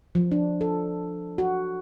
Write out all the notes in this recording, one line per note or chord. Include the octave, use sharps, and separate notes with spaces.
F3
D4
A4
F#4